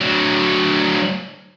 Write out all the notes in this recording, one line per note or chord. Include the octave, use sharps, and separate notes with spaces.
D2 F#3